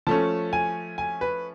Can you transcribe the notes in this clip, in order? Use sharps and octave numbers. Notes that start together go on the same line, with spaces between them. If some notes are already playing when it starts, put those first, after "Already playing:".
F3 A3 C#4 A5
G#5
G#5
B4